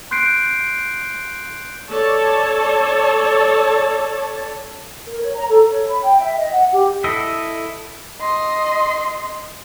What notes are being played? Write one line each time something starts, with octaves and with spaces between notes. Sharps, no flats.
C6 F#6 G6 C7 D7
A4 C#5 D5 A5
A#4
C#5
A#5
A4
C#5
B5
G5
E5
D#5
F#5
G4
E4 A4 D#5 E5
D#5 C6